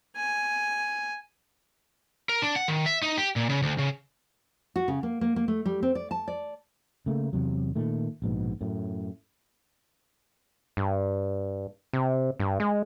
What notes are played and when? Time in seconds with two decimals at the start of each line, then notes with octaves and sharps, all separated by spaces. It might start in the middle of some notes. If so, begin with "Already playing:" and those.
0.17 G#5
2.29 A#4
2.42 D4
2.56 F#5
2.68 D#3
2.86 E5
3.02 D#4
3.18 G4
3.36 A#2
3.49 C#3
3.63 D2
3.79 C#3
4.76 F#4
4.88 C#3
5.03 A#3
5.21 A#3
5.36 A#3
5.48 A3
5.65 G3
5.83 C4
5.95 D5
6.11 A5
6.28 D5
7.06 C#3 A3 A#3
7.33 E2 C3 F#3
7.76 A#2 D#3 A3
8.22 A#1 G#2 B2
8.61 F#2 A2
10.77 G2
11.93 C3
12.40 G2
12.60 G#3